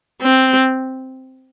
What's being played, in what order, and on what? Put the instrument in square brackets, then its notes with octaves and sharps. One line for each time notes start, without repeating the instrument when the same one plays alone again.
[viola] C4